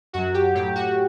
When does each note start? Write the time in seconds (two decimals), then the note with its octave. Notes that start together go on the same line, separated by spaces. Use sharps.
0.13 F#2 F#3 F#4
0.34 G4
0.55 A2 F#3 G4
0.75 F#4